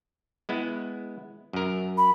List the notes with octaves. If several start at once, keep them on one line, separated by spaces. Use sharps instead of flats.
G#3 B3 E4
F#2 A#4
B5